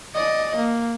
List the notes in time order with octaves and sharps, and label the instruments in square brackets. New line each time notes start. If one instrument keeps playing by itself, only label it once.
[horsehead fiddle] D5 D#5
A#3